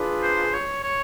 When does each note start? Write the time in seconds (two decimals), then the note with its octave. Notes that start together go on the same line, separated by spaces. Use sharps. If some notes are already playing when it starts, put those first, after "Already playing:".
Already playing: D4 F4 G#4 B4
0.23 C5
0.53 C#5
0.83 C#5